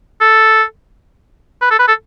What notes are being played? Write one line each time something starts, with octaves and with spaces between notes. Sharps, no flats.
A4
B4
A4
B4
A4